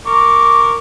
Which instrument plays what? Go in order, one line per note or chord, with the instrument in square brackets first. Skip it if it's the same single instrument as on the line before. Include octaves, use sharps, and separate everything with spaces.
[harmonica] A#4 C#6 D6